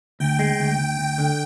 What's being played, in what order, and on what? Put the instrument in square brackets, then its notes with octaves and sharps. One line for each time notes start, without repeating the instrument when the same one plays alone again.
[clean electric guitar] D2 [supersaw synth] G5
[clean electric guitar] G#3
D2
D2
[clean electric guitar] D2 [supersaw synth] G5
[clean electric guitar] D3